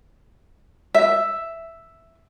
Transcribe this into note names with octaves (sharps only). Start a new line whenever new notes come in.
E5